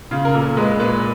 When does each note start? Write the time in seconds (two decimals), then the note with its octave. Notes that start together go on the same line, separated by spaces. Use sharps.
0.11 C#3 F4
0.25 A#4
0.34 A#2 A4
0.57 G#3 B4
0.80 A#2 B4